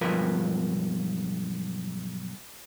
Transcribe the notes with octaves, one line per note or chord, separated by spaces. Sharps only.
B1 G2 F3 A#4 B4